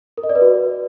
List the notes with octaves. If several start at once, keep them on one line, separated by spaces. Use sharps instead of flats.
A#4
D#5
D5
B4
F#4